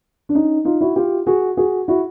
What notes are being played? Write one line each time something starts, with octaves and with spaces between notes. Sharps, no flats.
D4
C#4 D#4
D#4 F4
E4 F#4
F4 G4
F#4 G#4
F#4 G#4
E4 F#4